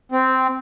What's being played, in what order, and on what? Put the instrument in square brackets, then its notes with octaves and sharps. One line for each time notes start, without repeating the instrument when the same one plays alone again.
[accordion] C4